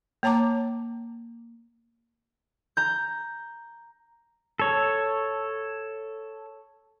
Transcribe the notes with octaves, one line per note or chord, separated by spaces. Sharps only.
A#3 C#5 A5 A#5 D6
A#5 G6
A4 C#5